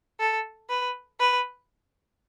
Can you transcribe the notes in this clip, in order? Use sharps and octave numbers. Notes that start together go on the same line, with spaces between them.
A4
B4
B4